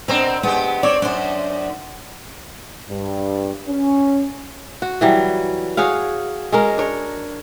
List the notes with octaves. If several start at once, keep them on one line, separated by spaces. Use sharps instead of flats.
B2 C4 D4 A#4 C5
G#3 B3 G4
C4 C#5 D5
F#2 D4 C5
G2
C#4
F#4
E3 F#3 G3
F#4 G#4 C#5 F5
G#3 C#4 A#4
D4 C#5